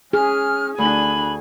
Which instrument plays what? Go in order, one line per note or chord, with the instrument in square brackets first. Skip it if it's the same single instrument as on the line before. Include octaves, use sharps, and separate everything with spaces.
[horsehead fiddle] C#4 [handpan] G#4 [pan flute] F6
[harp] D2 [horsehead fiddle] D4 G#5 [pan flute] B5